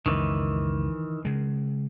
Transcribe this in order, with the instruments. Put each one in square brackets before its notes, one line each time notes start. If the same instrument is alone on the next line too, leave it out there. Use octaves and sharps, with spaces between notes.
[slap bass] C#2 F#2 [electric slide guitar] D#3 E3
[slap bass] C#3 G#3